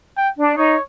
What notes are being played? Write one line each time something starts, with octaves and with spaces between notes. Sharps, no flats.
G5
D4
D#4 C#5